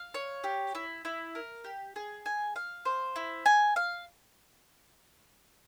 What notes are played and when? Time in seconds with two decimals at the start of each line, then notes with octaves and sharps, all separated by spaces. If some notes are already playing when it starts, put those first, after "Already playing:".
Already playing: F5
0.14 C#5
0.44 G4
0.75 E4
1.05 E4
1.35 A#4
1.64 G4
1.96 G#4
2.26 G#5
2.56 F5
2.85 C5
3.16 E4
3.46 G#5
3.76 F5